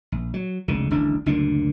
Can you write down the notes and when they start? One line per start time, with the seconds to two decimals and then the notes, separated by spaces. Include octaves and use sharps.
0.12 A#1
0.34 F#3
0.68 F1 C#2 D3
0.91 D#1 A1 D3 D4
1.26 F#1 D2 A#2 D4